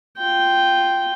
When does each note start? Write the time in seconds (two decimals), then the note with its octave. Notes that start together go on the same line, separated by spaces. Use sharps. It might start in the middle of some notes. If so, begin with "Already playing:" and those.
0.18 F4 G5